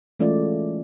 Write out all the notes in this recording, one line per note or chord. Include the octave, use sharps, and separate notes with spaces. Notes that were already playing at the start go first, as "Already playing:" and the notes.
E3 G#3 A3 C#4 F4 D5